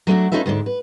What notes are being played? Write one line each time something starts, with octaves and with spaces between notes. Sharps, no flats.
F#3 A3 D4 F#4
C#4 D#4 F4 A4 B4 E5
D2 G#2 D3 D4
B4